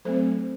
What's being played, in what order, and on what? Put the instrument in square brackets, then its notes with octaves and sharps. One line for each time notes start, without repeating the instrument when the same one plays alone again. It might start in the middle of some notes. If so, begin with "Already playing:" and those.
[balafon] F#3 A3 C4 A4 C5